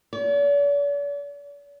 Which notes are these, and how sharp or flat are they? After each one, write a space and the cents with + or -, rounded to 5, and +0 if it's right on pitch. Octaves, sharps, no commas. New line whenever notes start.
D5 -45